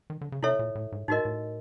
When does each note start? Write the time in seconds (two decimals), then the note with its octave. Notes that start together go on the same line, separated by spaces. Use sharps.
0.10 D#3
0.21 D3
0.32 C#3
0.43 C3 E4 A4 C#5 E5
0.59 A#2
0.75 A2
0.92 G#2
1.08 A2 D#4 F#4 A#4 D#5
1.25 A2